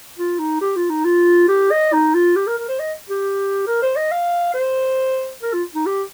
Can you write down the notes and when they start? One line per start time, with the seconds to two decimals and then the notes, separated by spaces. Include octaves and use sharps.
0.18 F4
0.39 D#4
0.61 G4
0.76 F4
0.90 D#4
1.05 F4
1.48 G4
1.71 D#5
1.93 D#4
2.14 F4
2.36 G4
2.47 A#4
2.59 A#4
2.68 C5
2.80 D#5
3.09 G4
3.67 A#4
3.82 C5
3.96 D#5
4.12 F5
4.54 C5
5.42 A#4
5.53 F4
5.75 D#4
5.86 G4